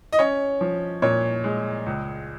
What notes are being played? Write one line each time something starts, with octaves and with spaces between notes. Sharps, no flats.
D#5
C#4 C#5
F3
A#2 C#5
G#3
C#2